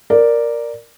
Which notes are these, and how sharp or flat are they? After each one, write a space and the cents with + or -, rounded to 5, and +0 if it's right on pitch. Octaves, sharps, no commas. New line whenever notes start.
A#4 +0 D5 +0